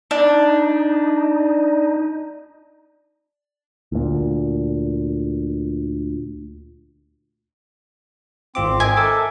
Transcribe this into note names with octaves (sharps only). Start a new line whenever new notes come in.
D4 D#4
D2 A#2
G#1 C4 F4 D6
D#5 E5 G#5
A4 A#4 E5 D6